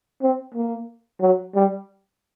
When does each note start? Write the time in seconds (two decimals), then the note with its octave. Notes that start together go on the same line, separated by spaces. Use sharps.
0.22 C4
0.54 A#3
1.21 F#3
1.55 G3